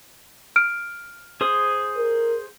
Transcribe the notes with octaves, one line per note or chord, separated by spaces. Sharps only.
F6 D7
G#4 C5 D#6
A#4